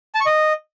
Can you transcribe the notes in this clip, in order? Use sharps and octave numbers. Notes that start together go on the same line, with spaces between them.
A5
C#6
D#5